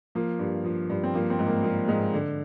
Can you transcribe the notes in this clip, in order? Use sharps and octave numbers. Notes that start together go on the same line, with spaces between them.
F3 A#3
G2
F3
G2
C4
F3 A#3
C4
G#2
A#3
F3 A#3
G#2 G#3
D3